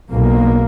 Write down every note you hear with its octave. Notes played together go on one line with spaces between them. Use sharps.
B1 B2 A#3